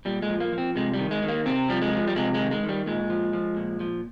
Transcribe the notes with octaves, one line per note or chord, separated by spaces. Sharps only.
A#2 G3
G#3
F3
A#3
F3
C4
C3 G#3
G3
D#3
G#3
D#3
A#3
C3 C4
F3 G3
G#3
F3
G3
C3 G#3
G#3
D#3
G#3
D#3
G3
A#2 G#3
F3
F3
A#2
F3